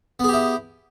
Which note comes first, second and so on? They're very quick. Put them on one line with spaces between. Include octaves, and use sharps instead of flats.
B3 G#4 G4 E4